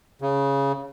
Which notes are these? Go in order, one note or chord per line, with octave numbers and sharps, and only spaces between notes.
C#3